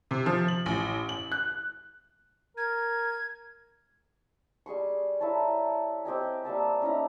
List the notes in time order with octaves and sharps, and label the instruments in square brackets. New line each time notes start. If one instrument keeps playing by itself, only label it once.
[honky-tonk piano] C3
F3
F#7
A1
F#7
F#6
[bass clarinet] A#4 [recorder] G#6
[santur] G3 G#4 C6 C#6
E4 A#4 C#5 A5
C4 G4 D#5 G#5
G3 A#3 E5 A5
C#4 D#4 E4 A#5